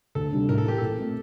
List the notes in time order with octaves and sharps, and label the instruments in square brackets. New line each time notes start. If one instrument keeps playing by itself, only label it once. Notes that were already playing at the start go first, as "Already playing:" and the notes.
[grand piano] D2 [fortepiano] A4
[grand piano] C3 G3 D4
[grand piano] A2 [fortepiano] A#4
[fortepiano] A4
[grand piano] E3 A#3 [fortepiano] G4
[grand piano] A#2 [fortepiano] A4
[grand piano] A3 C4